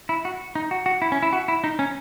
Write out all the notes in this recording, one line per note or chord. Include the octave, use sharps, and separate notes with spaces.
E4
F#4
D#4
F#4
F#4
E4
C#4
E4
F#4
E4
D#4
C#4